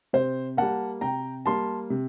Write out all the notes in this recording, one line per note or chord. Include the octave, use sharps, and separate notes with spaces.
C3 C5
G3 A#3 F#5 A5
C3 G5 A#5
G3 A#3 A5 C6
C3